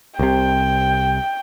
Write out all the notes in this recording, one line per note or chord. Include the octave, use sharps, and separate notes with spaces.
C2 C3 G5